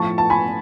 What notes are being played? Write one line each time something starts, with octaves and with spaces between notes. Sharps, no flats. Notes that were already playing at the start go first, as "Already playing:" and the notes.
Already playing: A2 F3 A5 C#6
A5
G#5 B5